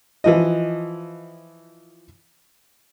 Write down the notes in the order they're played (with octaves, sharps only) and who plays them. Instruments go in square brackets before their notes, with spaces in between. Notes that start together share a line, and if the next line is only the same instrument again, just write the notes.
[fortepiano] E3 F3 D#5